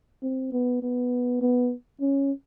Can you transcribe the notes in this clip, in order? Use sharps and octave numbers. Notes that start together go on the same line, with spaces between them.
C4
B3
B3
B3
C#4